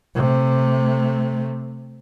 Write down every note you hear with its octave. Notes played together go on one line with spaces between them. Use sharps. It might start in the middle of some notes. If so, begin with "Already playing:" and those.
C3 A3